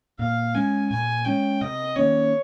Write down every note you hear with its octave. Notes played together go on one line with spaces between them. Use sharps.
A#2 F5
G#3 C#4 G#5
A#2 G#5
G#3 C#4 G5
C3 D#5
D#3 A#3 C#4 C#5